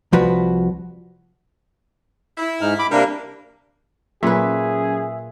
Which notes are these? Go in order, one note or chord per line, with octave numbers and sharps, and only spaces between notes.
C2 F3 F#4 B4
E4
G#2 D#4 F6
B5 D6
C3 G3 A#3 D4 A#4
A#2 F#3 C#4 G#4 B4 E5